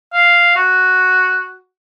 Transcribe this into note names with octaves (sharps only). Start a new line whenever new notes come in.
F5
F#4